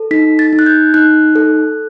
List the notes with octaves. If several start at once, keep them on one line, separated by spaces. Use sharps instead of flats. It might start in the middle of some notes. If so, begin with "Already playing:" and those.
Already playing: A4
D#4 B6
A6
D#4
F#6
G6
D#4 F#6
A4